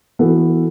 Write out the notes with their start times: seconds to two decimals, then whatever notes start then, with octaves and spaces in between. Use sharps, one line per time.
0.19 E3 B3 F#4 A4